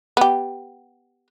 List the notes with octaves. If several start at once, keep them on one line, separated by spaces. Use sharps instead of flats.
B3 G4